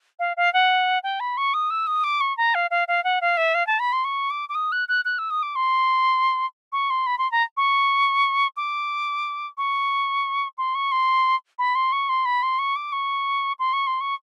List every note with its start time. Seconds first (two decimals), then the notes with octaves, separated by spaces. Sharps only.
0.19 F5
0.37 F5
0.54 F#5
1.04 G5
1.20 B5
1.37 C#6
1.54 D#6
1.70 E6
1.87 D#6
2.04 D6
2.21 C#6
2.37 A#5
2.55 F5
2.71 F5
2.88 F5
3.04 F#5
3.21 F5
3.37 E5
3.55 F5
3.67 A5
3.80 B5
3.93 C6
4.05 C#6
4.30 D6
4.49 D6
4.55 D#6
4.72 F#6
4.88 F#6
5.05 F#6
5.19 E6
5.30 D#6
5.43 D6
5.56 C6
6.73 C#6
6.90 C6
7.07 B5
7.18 C6
7.32 A#5
7.57 C#6
8.57 D6
9.58 C#6
10.58 C6
10.75 C#6
10.92 C6
11.59 B5
11.75 C6
11.92 C#6
12.09 C6
12.25 B5
12.43 C6
12.59 C#6
12.76 D6
12.92 C#6
13.59 C6
13.73 C#6
13.87 C6
14.01 C#6